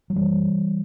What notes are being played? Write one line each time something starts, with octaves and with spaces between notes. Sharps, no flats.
F#3
F#2 E3 G3